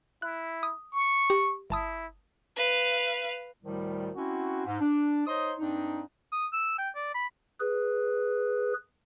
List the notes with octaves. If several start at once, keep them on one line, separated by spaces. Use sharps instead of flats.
E4 F#6
D#6
C#6
G4
G1 E4 A5 D#6
B4 F5
D2 A2 D#3 F3 G3
C4 C#4 E4 F#4
G#2
D4
D#4 C5 C#5 D#5 C6 D#6
G2 C4 D4 D#4
D#6
E6
G5
D5
B5
G#4 B4